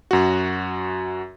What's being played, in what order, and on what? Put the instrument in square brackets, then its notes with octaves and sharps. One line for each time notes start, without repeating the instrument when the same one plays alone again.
[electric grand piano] F#2 F#4